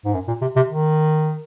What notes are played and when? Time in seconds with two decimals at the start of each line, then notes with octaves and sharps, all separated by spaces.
0.05 G#2
0.14 F#2
0.28 A#2
0.42 C3
0.56 C3
0.69 D#3